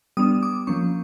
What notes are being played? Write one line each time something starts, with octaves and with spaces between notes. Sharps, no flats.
G3 B3 D4 D#6
D6
F3 A#3 C#4 C#6